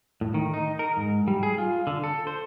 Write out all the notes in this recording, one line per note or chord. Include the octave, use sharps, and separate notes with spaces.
A2
D#3
D#4
A#4
G#2
G3
G#4
F4
D3
A4
C5